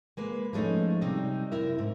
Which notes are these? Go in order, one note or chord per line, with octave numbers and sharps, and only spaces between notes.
G#3 A#3 B4
F3 G#3 A3 C#4 D#4
C3 G3 D#4
F#2 E4 A#4 E5
G#2